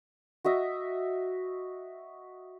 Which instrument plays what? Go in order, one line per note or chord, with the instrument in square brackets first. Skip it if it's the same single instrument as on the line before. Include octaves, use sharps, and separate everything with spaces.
[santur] F#4 D#5 E5